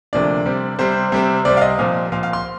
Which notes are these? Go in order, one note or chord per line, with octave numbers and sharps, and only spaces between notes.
D2 C3 F3 A#3 D4 D5
C3 G3 C4
C3 G3 C4 C5
C3 G3 C4
C3 G3 C4 D5
F5
D#5
A#2 F3 C4 F5
A#2 F3 C4 F5
F5
C6